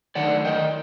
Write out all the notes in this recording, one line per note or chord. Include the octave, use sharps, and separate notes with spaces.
D#3 F#3 A3 D4 D5 F#5
D#5 G5